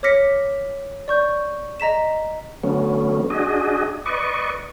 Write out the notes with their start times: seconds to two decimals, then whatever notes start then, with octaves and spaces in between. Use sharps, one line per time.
0.03 C#5 D6 F6 A#6 B6 C#7
1.08 D5 C#6 G6
1.80 D#5 A#5 B6 E7
2.63 D3 F#3 A3 B3 C#4
3.30 D4 F#4 G#4 D#5
4.06 B4 D5 D#5 C#6